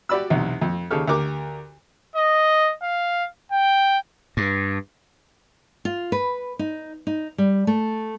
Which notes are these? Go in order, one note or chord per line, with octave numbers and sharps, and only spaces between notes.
F#4 G4 D5 B5 E6
B1 E2 C3
F2
D#2 C#3 G4 A4 F6
D2 G4 A#4 D6
D#5
F5
G5
G2
F4
B4
D#4
D#4
G3
A3